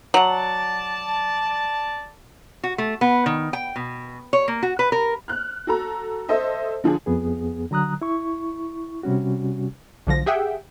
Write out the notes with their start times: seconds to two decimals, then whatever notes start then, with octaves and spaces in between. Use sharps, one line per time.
0.14 F#3 D5 F#5 A5
2.64 F#4
2.78 A3
3.01 B3
3.26 D#3
3.53 G5
3.76 B2
4.33 C#5
4.48 A#3
4.63 F#4
4.79 B4
4.92 A#4
5.28 F6 F#6
5.67 F#4 A4 A#5
6.29 A4 C5 D#5 E5
6.84 D3 F3 D4 G#4
7.06 F2 B3 G#4
7.71 D3 F#3 A#5 D#6 F#6
8.02 E4 C#6
9.03 C3 G3 C#4 F#4
10.07 B1 D3 F3 A#6
10.26 G4 G#4 E5 F#5 G5